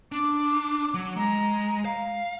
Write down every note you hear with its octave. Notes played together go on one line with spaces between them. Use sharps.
D4 D6
F#3
G#3 A#5
F5